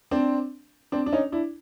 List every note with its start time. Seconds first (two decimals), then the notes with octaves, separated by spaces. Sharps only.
0.11 C4 D4
0.92 C4 D4
1.06 D4
1.13 C#4 D#4
1.32 D4 E4